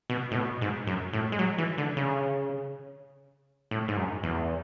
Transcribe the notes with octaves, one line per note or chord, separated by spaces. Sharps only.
B2
A2
B2
G#2
F#2
A2
G#3
F#3
E3
D3
C#3
A2
G#2
F#2
E2